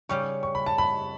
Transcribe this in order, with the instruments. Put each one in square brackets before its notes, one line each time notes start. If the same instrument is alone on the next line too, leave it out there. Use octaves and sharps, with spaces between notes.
[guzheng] C#3 G3 C#4 G4 [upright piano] C#6
[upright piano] C#6
B5
A5
B5